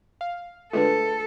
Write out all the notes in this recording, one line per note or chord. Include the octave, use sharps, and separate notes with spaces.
F5
D3 G#3 A3 F4 A4 B4 D5